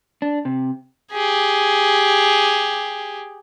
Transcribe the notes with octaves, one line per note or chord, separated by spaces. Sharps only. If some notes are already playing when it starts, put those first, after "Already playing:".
D4
C3
G4 G#4